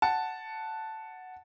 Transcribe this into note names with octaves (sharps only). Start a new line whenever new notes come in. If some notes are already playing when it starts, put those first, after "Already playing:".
F#5 A5